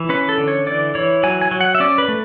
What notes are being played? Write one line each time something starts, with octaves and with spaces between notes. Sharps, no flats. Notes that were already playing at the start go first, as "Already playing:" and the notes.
Already playing: E3
C#4 B4
A4
D3
C#5
E3 D5
E3 C#5
F#3 G#5
G#5
F#3
F#5
E5
C#4 D5
B4
A3